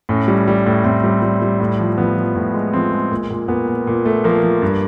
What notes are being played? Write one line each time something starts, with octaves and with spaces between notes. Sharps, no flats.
A2 C#4
G3
G3
A2
A2 C4
G3
G3
G3
A2
F3
F3 B3
F3
A2
G#3
F3 C4
G#3
A#2
A#2
A#2 B3
A#2
A#2
A3
F3 A#3
F3
G2